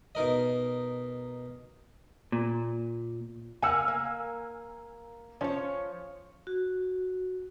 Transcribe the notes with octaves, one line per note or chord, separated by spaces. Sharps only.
B2 D#4 A#4 D#5
A#2
A#3 F#5 G#5 E6 F6
A#3
F3 C#4 C#5
F#4